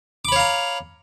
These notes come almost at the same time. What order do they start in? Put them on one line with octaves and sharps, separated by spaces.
D6 B5 C#5 F5 A#5